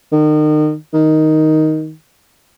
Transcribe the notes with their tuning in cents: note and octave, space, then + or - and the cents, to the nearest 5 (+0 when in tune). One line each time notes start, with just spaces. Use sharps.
D#3 -35
D#3 +5